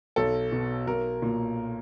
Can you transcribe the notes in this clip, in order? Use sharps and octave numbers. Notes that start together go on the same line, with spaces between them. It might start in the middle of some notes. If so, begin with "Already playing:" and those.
B1 A4
B2
B1 A#4
A#2